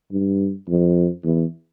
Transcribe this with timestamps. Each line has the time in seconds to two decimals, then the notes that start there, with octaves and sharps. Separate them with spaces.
0.11 G2
0.69 F2
1.24 E2